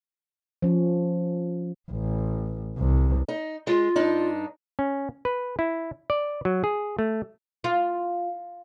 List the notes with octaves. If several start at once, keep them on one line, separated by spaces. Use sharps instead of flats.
F3 C#4
A1
C2
D#4
G#3 F4
G2 D4 D#4
C#4
B4
E4
D5
F#3
G#4
A3
F4